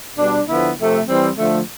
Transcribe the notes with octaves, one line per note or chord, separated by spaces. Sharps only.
B2 G3 D4
D3 F3 B3 E4
C3 F3 A3
E3 G3 C4
D3 F3 A3